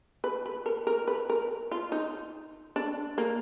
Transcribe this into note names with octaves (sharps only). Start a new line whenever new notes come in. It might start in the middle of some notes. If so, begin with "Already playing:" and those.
B4
B4
A#4
A#4
B4
A#4
F4
D#4
D4
A#3